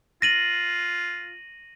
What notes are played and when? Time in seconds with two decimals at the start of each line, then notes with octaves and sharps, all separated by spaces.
0.22 F4 A#6 D#7 F#7